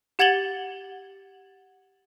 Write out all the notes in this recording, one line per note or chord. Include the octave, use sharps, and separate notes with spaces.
G4 F#5 G#6 A6 F#7 G7